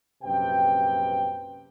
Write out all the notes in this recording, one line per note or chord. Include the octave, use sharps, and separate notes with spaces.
A#1 F#2 C3 B4 G5